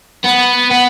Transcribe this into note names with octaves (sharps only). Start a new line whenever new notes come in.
B3
B3